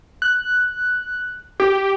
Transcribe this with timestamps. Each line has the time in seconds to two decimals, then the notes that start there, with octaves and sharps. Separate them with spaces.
0.22 F#6
1.60 G4